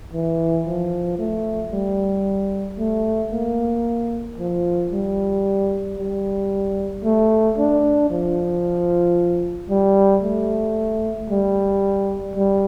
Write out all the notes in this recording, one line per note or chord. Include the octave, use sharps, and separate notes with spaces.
E3
F3
A3
G3
A3
A#3
F3
G3
G3
A3
D4
F3
G3
A3
G3
G3